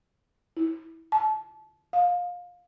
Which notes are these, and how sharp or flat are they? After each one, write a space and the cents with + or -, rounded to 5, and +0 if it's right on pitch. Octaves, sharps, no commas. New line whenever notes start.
E4 -20
A5 -25
F5 +25